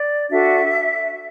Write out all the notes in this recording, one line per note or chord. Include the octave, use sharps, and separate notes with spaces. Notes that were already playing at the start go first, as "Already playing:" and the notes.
Already playing: D5
D4 F#4 A4 E5